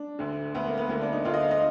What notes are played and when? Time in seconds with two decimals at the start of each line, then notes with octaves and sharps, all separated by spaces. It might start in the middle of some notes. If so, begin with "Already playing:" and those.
Already playing: D4
0.19 D2 D3
0.55 D2 D3 B3
0.66 A#3
0.78 B3
0.89 D2 D3 A#3
1.01 D4
1.12 D#4
1.25 D2 F4
1.28 D3
1.33 D#5
1.42 F5
1.51 D#5